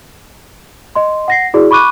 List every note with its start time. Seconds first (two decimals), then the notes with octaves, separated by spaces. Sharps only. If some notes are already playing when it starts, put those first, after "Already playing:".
0.95 D#5 C6
1.28 F#5 A#6 C7
1.54 E4 F#4 G#4 D5
1.71 B5 C#6 D6 F#6 D#7